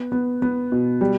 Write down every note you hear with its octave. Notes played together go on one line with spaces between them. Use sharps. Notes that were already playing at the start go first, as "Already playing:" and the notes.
Already playing: B3
B3
B3
B2
G3